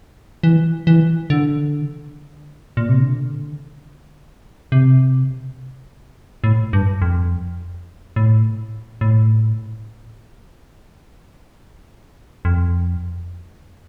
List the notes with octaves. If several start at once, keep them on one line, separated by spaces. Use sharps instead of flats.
E3
E3
D3
A#2
C3
D3
C3
A2
G2
F2
A2
A2
F2